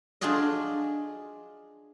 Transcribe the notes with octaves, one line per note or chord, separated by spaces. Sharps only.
D4 F4 F#4 G#4 D5 D#5